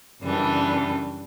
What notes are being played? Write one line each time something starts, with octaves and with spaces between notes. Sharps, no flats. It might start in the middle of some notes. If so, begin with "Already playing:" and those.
F#2 C#3 E3 G3 D4